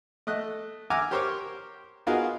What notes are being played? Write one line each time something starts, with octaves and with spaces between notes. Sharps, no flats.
A3 D#5 F#6
E5 F#5 G#5 A#5 D6 F6
G4 A#4 C5 C#5 D6 F6
B3 D#4 F4 F#4 G#4 A#4